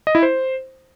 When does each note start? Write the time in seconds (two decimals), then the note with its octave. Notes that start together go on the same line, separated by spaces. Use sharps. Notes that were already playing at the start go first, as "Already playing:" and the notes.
0.07 D#5
0.15 E4
0.23 C5